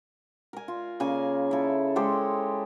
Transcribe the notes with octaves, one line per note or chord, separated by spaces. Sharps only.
A#4 G#5
F4
C#3 A#3 G#5
E4 A4
G#3 G4 A4 C5